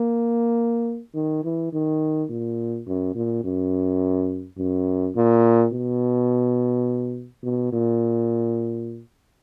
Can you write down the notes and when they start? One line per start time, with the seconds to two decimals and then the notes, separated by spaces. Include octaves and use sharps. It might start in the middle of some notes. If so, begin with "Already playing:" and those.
Already playing: A#3
1.15 D#3
1.44 E3
1.73 D#3
2.30 A#2
2.87 F#2
3.16 A#2
3.44 F#2
4.58 F#2
5.16 A#2
5.73 B2
7.44 B2
7.73 A#2